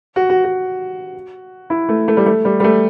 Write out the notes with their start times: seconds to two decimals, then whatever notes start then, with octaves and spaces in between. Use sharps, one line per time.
0.16 F#4
0.30 F#4
0.44 F#4
1.70 E4
1.89 A3
2.08 A3
2.17 G3
2.26 A3
2.45 G3
2.60 G3
2.64 A3